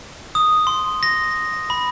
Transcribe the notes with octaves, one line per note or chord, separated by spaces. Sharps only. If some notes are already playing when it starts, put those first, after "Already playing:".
D#6
C6
A#6
B5